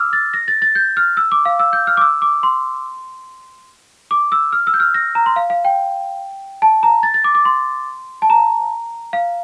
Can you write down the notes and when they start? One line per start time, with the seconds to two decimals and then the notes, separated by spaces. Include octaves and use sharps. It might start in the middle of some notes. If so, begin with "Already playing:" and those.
Already playing: D6 E6 F6
0.13 A6
0.33 A#6
0.48 A6
0.62 A6
0.75 G6
0.97 F6
1.17 E6
1.32 D6
1.45 F5
1.59 E6
1.73 G6
1.87 F6
1.97 D6
2.01 E6
2.22 D6
2.43 C6
4.11 D6
4.32 E6
4.52 F6
4.67 E6
4.74 G6
4.80 F6
4.94 A#6
5.15 A#5
5.26 C6
5.36 F5
5.50 F5
5.65 G5
6.62 A5
6.83 A#5
7.03 A6
7.14 A6
7.24 D6
7.35 D6
7.45 C6
8.22 A5
8.30 A#5
9.13 F5